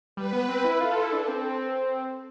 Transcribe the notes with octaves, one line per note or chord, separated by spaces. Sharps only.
G3 B4
B3
C4
E4
F4 A4
F4
E4
D4
C4